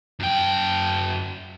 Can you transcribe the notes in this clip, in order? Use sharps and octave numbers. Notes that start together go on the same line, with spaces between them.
F#2 G5